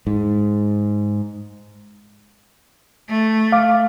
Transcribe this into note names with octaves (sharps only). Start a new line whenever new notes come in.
G#2
A3
F5 D6